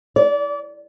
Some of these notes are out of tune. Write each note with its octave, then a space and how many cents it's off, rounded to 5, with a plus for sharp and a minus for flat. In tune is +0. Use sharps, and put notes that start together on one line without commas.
D5 -30